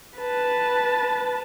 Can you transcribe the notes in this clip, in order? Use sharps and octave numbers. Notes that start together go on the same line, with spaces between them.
B4 A5